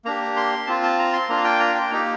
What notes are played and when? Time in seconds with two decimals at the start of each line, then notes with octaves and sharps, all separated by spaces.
0.05 A#3 D4 G4 A#5
0.37 C6
0.67 C4 F4 A5
0.83 A5
0.99 A#5
1.13 C6
1.29 A#3 D4 F4 A#5
1.37 F5
1.44 G5
1.60 A#5
1.75 G5
1.91 A#3 D#4 G4 A#5